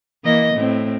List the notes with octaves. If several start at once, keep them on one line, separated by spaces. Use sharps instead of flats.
E3 A#3 D#5
A2 C4